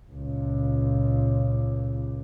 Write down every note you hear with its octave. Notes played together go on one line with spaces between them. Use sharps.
C#2 A#2